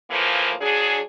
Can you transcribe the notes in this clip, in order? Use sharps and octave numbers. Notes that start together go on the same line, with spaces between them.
A2 E3 F3 A#3
F#3 D4 G#4